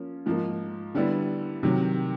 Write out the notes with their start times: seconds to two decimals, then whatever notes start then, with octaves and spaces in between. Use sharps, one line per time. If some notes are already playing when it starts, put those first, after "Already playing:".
Already playing: F3 A#3 C#4
0.26 G#2 F3 A#3 D#4
0.95 D3 G3 B3 E4
1.63 C3 D#3 F#3